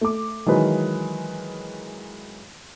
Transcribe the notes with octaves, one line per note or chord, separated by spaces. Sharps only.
A3 D6
D#3 E3 F#3 G#3 B4